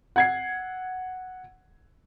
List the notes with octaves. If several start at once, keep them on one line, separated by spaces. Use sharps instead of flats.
F#5 G#6 C7